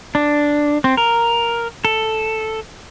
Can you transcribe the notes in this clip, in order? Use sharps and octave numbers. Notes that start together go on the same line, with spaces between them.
D4
C4
A#4
A4